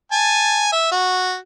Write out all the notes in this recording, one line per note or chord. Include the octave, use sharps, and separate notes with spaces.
G#5 A5
E5
F#4